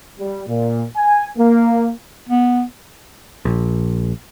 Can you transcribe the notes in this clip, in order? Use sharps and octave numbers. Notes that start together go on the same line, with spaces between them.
G3
A#2
G#5
A#3
B3
A#1